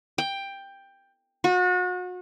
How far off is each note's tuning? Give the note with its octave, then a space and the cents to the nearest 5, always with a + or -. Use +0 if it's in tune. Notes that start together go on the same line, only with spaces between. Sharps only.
G5 +10
F#4 -35